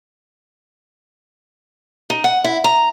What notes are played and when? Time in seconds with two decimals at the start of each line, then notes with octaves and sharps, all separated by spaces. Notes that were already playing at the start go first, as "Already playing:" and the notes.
2.10 D#4
2.24 F#5
2.44 E4
2.64 A#5